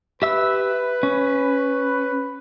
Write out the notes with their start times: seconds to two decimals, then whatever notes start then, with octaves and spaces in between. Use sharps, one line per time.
0.22 G4 B4 E5 E6
1.03 C#4